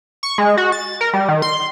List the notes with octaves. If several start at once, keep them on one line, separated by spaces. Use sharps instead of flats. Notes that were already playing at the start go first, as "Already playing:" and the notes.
C#6
G#3
F#4
A6
A#4
G3
D#3
C6